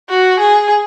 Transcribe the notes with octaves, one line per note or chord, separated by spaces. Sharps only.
F#4
G#4